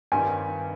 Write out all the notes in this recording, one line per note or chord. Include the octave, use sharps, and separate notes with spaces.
G2 D#3 G3 C4 G#5